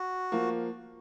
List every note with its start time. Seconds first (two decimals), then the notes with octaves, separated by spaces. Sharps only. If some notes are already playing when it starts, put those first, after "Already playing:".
Already playing: F#4
0.32 F3 A#3